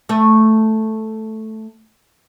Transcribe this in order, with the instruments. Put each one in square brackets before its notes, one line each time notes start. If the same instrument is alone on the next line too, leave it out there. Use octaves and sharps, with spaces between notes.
[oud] A3 E5